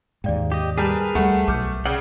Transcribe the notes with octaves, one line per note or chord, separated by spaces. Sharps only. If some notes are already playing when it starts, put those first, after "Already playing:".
D#2 G#2 D5 F5 G5
G4 D#5
G3 G#4 A#4 B4 A5 G6 E7
D2 G3 A3 F#5 A5
B1 D6 F6 G6
C#3 D5 F#5 G5 D6